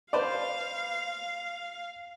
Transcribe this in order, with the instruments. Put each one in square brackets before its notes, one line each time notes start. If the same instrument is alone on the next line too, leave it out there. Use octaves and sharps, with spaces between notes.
[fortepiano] B4 C5 D5 [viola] F5